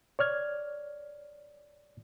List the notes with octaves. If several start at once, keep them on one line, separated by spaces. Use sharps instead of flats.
C#5 D5 F6 G#6